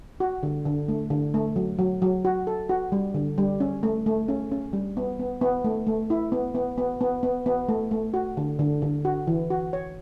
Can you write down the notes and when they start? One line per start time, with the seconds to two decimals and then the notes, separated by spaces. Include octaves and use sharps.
0.20 F#4
0.43 D3
0.66 D3
0.88 A3
1.10 D3
1.34 A3
1.56 F#3
1.79 F#3
2.02 F#3
2.25 F#4
2.47 A4
2.69 F#4
2.92 G3
3.14 D3
3.38 G3
3.60 C#4
3.83 A3
4.06 A3
4.28 C#4
4.52 C#4
4.73 G3
4.97 B3
5.19 B3
5.41 B3
5.64 A3
5.87 A3
6.10 E4
6.32 B3
6.55 B3
6.78 B3
7.01 B3
7.23 B3
7.46 B3
7.69 A3
7.91 A3
8.14 F#4
8.37 D3
8.59 D3
8.82 D3
9.05 F#4
9.27 E3
9.50 F#4
9.73 C#5